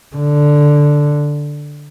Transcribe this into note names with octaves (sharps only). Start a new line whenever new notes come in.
D3